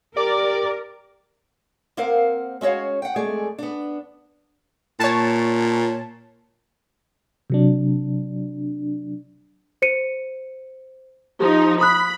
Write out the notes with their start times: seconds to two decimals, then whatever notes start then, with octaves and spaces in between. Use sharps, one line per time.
0.17 G4 A#4 D5 D6
1.97 A#3 C4 A#4 C5 F5 F#5
2.61 G#3 C#4 F#4 C#5 F5
3.02 F#5 G5
3.16 F2 G#3 A3 G#4 D5
3.58 B3 D4
5.00 A#2 C#5 A5
7.50 C3 F#3 D4
9.82 C5 C#7 D#7
11.40 F3 D#4 G4
11.81 B5 D#6 F#6